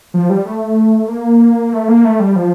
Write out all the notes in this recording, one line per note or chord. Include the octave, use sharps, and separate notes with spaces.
F3
G3
A3
A#3
A3
A#3
A3
G3
F3